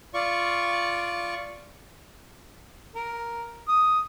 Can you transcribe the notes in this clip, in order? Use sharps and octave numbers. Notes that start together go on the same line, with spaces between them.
F4 D5 C#6
A#4
D#6